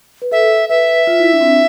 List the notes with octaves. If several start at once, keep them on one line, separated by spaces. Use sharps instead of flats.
B4
A4 E5
B4 E5
F4
E4
D4
C4
D4